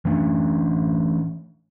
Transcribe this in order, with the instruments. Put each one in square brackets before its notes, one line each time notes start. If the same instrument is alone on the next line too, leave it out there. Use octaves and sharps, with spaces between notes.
[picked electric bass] E3 A3 C#4 D4